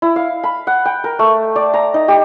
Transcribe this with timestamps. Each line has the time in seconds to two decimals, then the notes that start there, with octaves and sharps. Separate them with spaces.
0.02 E4
0.16 F5
0.43 B5
0.67 F#5
0.85 G5
1.04 A#4
1.19 A3
1.56 D5
1.74 A#5
1.94 D#4
2.08 G4